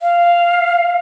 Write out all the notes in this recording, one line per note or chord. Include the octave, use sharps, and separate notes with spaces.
F5